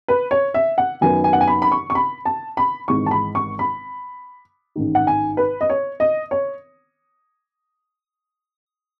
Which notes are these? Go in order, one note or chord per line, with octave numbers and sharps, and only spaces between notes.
B4
C#5
E5
F#5
F#2 D#3 F#3 B3 G#5
G#5
F#5
G#5
B5
B5
C#6
C#6
B5
A5
B5
G#1 G#2 E3 G#3 C#6
A5
B5
C#6
B5
A1 G#2 D#3
F#5
G#5
B4
D#5
C#5
D#5
C#5